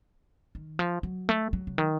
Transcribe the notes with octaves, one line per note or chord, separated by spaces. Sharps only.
D#3
F3
F#3
A3
F#3
C#3
D#3